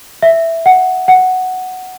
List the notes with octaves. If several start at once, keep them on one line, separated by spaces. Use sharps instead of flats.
E5
F#5
F#5